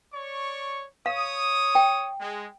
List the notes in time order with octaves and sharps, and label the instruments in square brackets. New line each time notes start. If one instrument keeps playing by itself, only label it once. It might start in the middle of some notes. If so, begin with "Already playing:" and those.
[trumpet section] C#5 D5 C#6
[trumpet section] C#5 D#6 [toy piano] F5
[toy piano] G5
[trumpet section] G#3